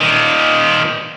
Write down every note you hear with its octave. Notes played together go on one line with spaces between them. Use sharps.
A#2 D#3